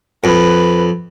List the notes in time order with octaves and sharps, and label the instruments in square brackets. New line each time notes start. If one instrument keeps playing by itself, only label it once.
[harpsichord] F2 [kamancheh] B4